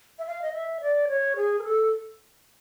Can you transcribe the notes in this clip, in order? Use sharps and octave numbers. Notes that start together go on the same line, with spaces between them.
E5
F5
D#5
E5
D5
C#5
G#4
A#4
A4